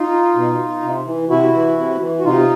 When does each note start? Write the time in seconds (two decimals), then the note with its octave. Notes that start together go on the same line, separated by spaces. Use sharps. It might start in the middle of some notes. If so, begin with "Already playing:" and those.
Already playing: D#4 F4
0.35 B2
0.82 C3
1.06 E3
1.30 C3 E4 F#4
1.54 E3
1.78 C3
2.01 E3
2.20 F#4
2.25 C3 D#4 F4